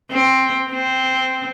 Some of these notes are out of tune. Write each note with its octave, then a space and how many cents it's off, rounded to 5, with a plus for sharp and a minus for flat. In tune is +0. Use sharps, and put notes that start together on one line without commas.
C4 +10
C4 -5